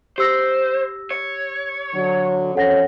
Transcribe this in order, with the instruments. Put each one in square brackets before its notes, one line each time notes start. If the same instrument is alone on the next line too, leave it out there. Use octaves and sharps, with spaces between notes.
[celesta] G4 E6 A#6 [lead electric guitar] C5
[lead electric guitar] C#5
[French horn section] D3 F#3
[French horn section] F2 C#4 C#5 [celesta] A4 F#5 A#6